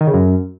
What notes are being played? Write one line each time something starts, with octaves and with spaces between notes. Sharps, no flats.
D#3
C#3
F#2